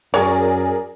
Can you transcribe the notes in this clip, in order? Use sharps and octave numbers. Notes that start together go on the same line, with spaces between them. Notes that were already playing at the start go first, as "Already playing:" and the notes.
F#2 G#4 A#4 C#5 D5